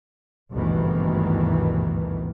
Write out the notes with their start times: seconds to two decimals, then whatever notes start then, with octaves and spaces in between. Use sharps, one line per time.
0.52 G#1 D2 G2 B2 D#3 E3